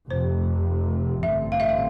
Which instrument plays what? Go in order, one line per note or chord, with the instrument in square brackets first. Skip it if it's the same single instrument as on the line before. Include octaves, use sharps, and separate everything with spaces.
[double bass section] F1 F2 C3 [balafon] C5
[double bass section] A1 G2 D3 A3 C4 [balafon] E5
[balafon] F5
E5
F5